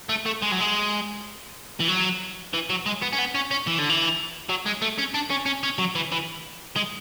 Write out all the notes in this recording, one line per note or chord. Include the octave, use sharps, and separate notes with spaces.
A3
A3
G#3
F#3
G#3
E3
F#3
E3
F#3
G#3
B3
C#4
B3
C#4
C#4
E3
D3
E3
F#3
G#3
A3
C#4
D4
C#4
C#4
C#4
F#3
E3
E3
G#3